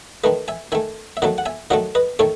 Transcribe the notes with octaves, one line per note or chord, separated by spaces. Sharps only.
D#3 A3 B4 D#5
E5 G#5
D#3 A3 E5 G#5
E5
D#3 F#3 A3 D#5 F#5
F#5
E5 G#5
D#3 F#3 A3 D#5 F#5
B4 D#5
D#3 A3 A4 C#5